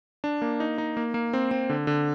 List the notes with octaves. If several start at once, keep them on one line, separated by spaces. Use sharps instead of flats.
D4
A#3
D#4
D#4
A#3
A#3
C4
C4
D3
D3